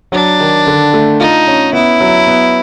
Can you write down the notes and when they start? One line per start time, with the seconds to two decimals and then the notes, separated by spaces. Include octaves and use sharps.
0.12 F#3 D4
0.40 D#3
0.67 D3
0.94 A3
1.19 D#4 F4
1.47 C#4
1.73 B3 E4
2.00 F#3
2.27 B3